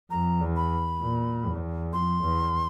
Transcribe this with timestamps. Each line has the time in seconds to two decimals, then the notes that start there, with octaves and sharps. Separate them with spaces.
0.10 F2 A#5
0.41 E2
0.56 B5
1.02 A#2
1.47 E2
1.93 F2 C6
2.23 E2